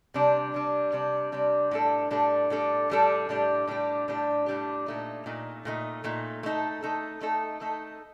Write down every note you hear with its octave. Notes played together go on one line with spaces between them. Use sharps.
C3 G3 D4
C3 G3 D4
C3 G3 D4
C3 G3 D4
A2 G3 D4 A4
A2 G3 D4 A4
A2 G3 D4 A4
A2 G3 D4 A4
A2 G3 D4 G4
A2 G3 D4 G4
A2 G3 D4 G4
A2 G3 D4 G4
A#2 A3 D#4
A#2 A3 D#4
A#2 A3 D#4
A#2 A3 D#4
A3 D#4 A4
A3 D#4 A4
A3 D#4 A4
A3 D#4 A4